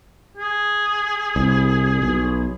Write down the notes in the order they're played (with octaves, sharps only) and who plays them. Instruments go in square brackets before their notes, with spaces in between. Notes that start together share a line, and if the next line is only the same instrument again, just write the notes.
[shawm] G#4
[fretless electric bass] C2
B1